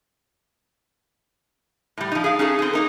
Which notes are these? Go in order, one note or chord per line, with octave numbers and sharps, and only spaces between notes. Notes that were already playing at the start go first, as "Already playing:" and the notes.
A2 G3
F3 D#4
G#4 F5
C#4 D#4 G#4 A4
C4 G#4
A#3 D#4 A#4